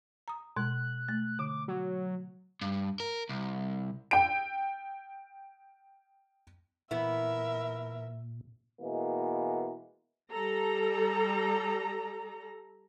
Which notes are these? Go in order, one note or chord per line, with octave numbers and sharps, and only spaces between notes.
A#5 D#6
B2 G#3 F#6
A3
D3 D6
F#3
G2
A#4
C2
G5 D7
A#2 E3 B3 E4 A#4 E5
B2 E3 G#3 A#3
G3 A4 A#5